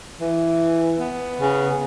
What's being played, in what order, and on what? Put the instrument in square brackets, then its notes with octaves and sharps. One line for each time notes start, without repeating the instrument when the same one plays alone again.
[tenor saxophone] E3
B3
[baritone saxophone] C#3